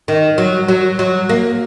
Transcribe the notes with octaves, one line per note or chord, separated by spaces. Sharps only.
D#3
F#3
F#3
F#3
A#3